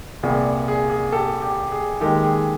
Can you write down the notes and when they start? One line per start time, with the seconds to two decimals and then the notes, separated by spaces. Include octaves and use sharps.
0.23 C2 A#2 G3 B3 G#4
0.68 G#4
0.90 G#4
1.12 G4 A4
1.42 G4
1.72 G#4
2.01 D#2 D#3 G#3 G4 A4
2.24 G#4